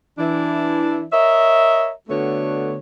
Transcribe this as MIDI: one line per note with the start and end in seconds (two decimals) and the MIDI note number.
0.18 1.03 52
0.18 1.03 62
0.18 1.03 64
1.13 1.90 70
1.13 1.90 73
1.13 1.90 75
1.13 1.90 76
2.09 2.76 50
2.09 2.76 57
2.09 2.76 59
2.09 2.76 62
2.09 2.76 66
2.09 2.76 73